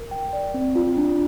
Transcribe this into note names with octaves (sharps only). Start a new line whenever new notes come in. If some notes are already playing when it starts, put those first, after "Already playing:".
Already playing: A#4
G5
D5
C4
F4
D4